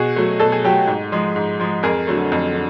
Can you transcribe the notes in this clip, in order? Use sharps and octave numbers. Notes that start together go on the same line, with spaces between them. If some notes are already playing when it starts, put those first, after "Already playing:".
Already playing: B2 F#4 G#4
F#3 A3
B2 A4
G#4
F#3 A3 G4 A4
G#2
F3 G#3
G#2
F3 G#3
F2 G#4 A#4
D3 F#3 A3
F2
D3